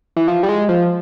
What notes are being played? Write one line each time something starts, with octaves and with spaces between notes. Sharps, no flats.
E3
F3
G3
G#3
F3